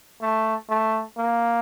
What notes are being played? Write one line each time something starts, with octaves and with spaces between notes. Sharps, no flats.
A3
A3
A#3